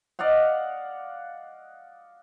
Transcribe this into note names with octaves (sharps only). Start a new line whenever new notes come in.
D5 D#5 F5 F#5